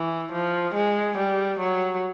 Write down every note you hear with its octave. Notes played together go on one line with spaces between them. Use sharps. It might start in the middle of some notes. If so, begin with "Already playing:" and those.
Already playing: E3
F3
G#3
G3
F#3